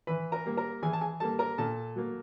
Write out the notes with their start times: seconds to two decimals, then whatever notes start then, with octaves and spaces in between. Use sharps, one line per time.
0.07 E3 B4 B5
0.32 A#4 A#5
0.46 G3 A#3
0.57 A#4 A#5
0.82 E3 G#4 G#5
0.93 A5
1.01 G#4 G#5
1.20 G3 A#3 A4 A5
1.39 A#4 A#5
1.58 A#2 A4 A5
1.96 F#3 A#3